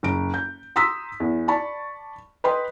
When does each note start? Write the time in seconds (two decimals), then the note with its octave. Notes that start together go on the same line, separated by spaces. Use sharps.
0.03 F#1 D7
0.34 G6
0.76 A#5 C6 D#6 E6 B6
1.20 E2
1.48 D5 A5 B5 C#6
2.44 B4 D#5 G5 B5 C6